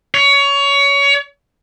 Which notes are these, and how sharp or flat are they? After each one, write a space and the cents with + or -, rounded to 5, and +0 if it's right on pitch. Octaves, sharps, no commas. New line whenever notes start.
C#5 +20